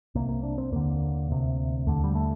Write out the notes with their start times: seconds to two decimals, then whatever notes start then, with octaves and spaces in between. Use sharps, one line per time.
0.15 C2 C3 A#3
0.29 A#3
0.43 D4
0.58 C4
0.72 D#2 D3 A#3
1.30 D2 C3
1.86 D#2 D3 A3
2.04 G3
2.15 A3